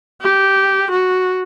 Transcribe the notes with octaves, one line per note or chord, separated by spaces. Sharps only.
G4
F#4